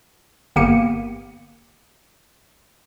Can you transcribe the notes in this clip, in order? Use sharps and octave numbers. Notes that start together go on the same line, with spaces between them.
G1 A#3 B3 G4 C#7 D#7